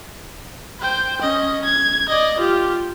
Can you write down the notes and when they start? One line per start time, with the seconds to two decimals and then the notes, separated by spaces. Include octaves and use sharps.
0.80 C5 G5
1.21 C#4 D#5
1.64 G#6
2.09 D5 D#5
2.38 F4 G4